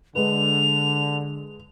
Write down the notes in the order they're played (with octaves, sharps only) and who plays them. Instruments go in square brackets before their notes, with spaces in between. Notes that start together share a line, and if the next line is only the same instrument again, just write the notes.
[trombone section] D3 [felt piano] G#3 B4 [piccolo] F7